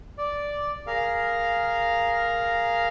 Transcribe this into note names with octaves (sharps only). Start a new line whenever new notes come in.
D5
G#4 A#4 F5